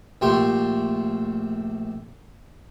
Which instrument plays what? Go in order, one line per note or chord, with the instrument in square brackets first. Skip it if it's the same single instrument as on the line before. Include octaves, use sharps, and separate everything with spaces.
[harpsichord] A#1 A3 G4 C6